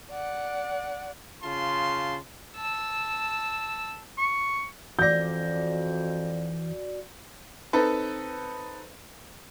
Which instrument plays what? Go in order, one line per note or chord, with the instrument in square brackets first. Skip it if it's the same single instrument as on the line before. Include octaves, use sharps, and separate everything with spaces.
[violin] D5 F#5
[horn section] C#3 F4 A5 C6
[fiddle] A5 E6
[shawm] C#6
[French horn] F2 [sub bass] E3 [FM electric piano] F#4 D5 [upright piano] G6 A#6
[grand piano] C4 D#4 A4 B4